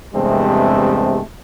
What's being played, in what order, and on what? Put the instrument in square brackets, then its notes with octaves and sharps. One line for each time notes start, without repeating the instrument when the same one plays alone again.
[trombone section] E2 G2 C3 G#3 A3 C4